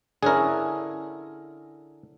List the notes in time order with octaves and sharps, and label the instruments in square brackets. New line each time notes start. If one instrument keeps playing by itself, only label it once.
[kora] D3 C#4 E4 [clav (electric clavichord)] G#4 A#4